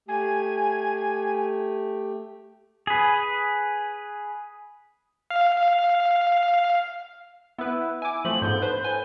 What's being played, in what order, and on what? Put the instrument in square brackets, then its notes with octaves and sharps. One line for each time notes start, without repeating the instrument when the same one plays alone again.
[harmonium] A3 G4 [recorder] G#5
[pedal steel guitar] G#4 B4
[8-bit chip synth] F5
[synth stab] B3 B4 [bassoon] E4
[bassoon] E4 [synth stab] G#5 D6
[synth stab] F3 A3 [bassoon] C4 [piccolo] F#7
[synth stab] G#2 F3 B3 [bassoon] D3 [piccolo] G6
[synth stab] B4 C5
[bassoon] A2 [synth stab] G#5